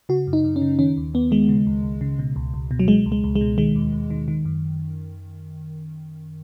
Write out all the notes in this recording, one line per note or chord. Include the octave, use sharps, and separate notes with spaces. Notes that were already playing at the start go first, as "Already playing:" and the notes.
C#3 F#4
F#2
D#4
F#2
C#4
C#3
D#3 C#4
D#2
D#2 B3
D#3 G#3
C#3
C#2
C#2
C#3
B2
C#2
C#2
B2
F#3
B2 G#3
C#2
G#3
C#2
G#3
B2
D#3 G#3
D#2
D#2
D#3
D#3
F#2